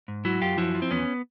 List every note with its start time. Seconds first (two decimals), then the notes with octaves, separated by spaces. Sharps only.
0.08 G#2
0.25 F#3 E4 F#4
0.41 F#2 F4 G4
0.57 F3 E4 F#4
0.75 F3
0.82 C4
0.91 E2 B3 C#4